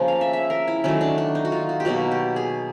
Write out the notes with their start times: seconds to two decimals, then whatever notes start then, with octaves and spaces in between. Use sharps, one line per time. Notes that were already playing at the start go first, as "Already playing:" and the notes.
Already playing: C#3 F3 A#3
0.08 F5
0.21 E5
0.33 E5
0.50 A#4
0.68 E4
0.84 D#3 F#3 A3 C#4
1.01 D4
1.18 D4
1.35 D#4
1.45 F#4
1.52 F4
1.69 F#4
1.80 G4
1.85 B2 F#3 A#3 F#4
2.11 G4
2.36 G#4